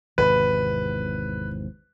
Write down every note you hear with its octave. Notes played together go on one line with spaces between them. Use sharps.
G#1 E2 C3 B4